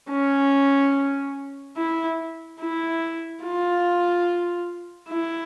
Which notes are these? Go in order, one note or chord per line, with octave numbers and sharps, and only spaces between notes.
C#4
E4
E4
F4
E4